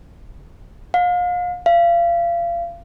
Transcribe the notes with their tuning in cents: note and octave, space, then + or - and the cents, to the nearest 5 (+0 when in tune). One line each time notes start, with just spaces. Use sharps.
F5 +35
F5 -30